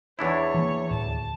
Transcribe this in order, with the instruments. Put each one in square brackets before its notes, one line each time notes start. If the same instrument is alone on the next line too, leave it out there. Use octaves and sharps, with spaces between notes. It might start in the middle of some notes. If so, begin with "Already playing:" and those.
[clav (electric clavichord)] E2 D4 E4 [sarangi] C#5
[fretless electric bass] E3 A#3
[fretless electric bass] D#1 D2 A2 [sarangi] A5